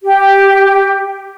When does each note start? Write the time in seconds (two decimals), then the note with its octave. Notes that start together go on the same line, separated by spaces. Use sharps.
0.04 G4